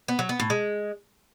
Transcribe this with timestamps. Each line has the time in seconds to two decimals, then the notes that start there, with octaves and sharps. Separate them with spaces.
0.08 B3
0.19 F#3
0.29 B3
0.40 A2
0.50 G#3